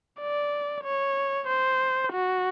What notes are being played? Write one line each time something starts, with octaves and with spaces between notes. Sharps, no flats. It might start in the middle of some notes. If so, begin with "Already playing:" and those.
D5
C#5
C5
F#4